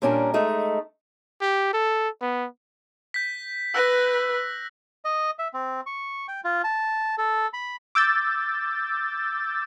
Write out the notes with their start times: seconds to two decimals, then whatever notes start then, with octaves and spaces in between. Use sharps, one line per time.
0.02 A#2 G3 C#4 D4 A#4
0.34 G#3 A3 D#4
1.41 G4
1.74 A4
2.21 B3
3.14 G6 B6
3.74 B4 E6 F#6 A#6
5.05 D#5
5.39 E5
5.53 C4
5.86 C#6
6.28 G5
6.44 F4
6.64 A5
7.18 A4
7.53 B5
7.95 D6 E6 G6 A6